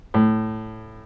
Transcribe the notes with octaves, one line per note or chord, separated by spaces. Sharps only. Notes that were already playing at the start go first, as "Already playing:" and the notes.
A2